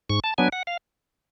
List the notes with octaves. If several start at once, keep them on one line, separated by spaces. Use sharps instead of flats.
G#2 C#6
A5
F#3 B3 D4 G#5
F#5
F5